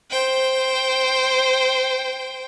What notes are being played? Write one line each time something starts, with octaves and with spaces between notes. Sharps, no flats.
C5 G5